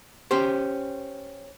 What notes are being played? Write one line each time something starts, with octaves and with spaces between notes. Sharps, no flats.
C#4 G4 C5